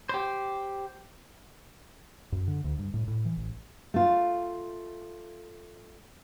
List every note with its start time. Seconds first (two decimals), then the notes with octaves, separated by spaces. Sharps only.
0.09 G4 C5
2.32 F#2
2.48 D3
2.64 D2
2.79 G2
2.94 A2
3.08 A2
3.25 E3
3.37 A1
3.94 A3 F4